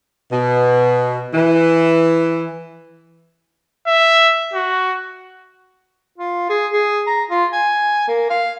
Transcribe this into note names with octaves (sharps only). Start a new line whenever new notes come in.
B2
E3
E5
F#4
F4
G#4
G#4
A#5
F4
G#5
A#3
F5